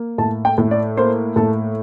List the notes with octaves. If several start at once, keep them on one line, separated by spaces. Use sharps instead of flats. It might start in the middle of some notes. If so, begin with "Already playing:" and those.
Already playing: A#3
A2 A5
G5
A2
D5
A#3 C5
A2 A4